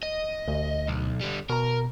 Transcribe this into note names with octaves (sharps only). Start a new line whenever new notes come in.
D#5
D2
B1
D3 G3
B2 A#4 A#5